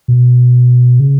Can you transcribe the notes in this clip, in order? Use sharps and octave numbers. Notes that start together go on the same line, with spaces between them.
B2
C#3